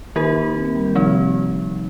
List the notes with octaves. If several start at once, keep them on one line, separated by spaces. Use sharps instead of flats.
D#3 A#3 D#4 G4 A#4
D#4
D#4
C4
A#3
G3
D#3
C3 F3 C4 D#4